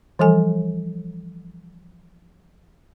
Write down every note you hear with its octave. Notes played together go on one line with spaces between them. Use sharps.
E3 F3 G3 A4 G#5